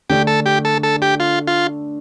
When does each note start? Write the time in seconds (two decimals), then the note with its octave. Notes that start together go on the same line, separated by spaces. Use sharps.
0.10 D3 A3 D4 G4
0.27 A4
0.46 G4
0.65 A4
0.83 A4
1.02 G4
1.20 F4
1.47 F4